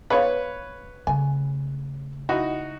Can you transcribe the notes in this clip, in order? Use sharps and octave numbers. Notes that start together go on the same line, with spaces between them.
G#3 B3 F4 B4 C#5
C#3 A3 G#5
D#4 E4 F#4